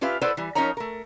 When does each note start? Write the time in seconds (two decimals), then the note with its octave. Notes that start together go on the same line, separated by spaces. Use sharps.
0.01 C#4 F4 G4 B4 E5 F5
0.21 E4 A4 B4 C5 D5 F#5
0.37 E3 G3
0.55 F3 C#4 D#4 A#4 C#5 A#5
0.77 A3 A#4